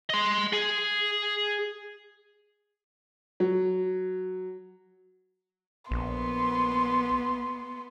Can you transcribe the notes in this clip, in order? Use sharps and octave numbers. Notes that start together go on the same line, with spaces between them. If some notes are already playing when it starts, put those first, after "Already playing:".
D#5 C6
G#4
F#3
A#1 B3 C6